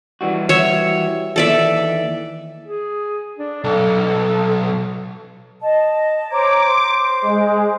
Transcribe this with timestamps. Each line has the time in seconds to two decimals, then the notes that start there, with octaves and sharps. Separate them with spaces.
0.21 E3 G3 F#4
0.49 C#5 E5
1.36 D#2 E3 A4 D5 E5
2.65 G#4
3.39 D4
3.64 B1 A4
5.62 D#5 A5
6.30 C5 C#5 A#5 D6
6.65 C5
7.22 G#3